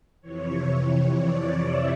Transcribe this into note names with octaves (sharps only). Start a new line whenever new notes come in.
F2 C3 E3 C#5
D5
E5